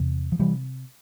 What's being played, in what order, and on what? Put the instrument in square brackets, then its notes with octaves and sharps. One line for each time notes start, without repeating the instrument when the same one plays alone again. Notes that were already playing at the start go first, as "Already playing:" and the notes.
Already playing: [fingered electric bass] E2 C3
F3
C3 E3 G3